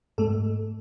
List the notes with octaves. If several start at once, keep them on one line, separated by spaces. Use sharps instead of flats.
G#2 A3 A4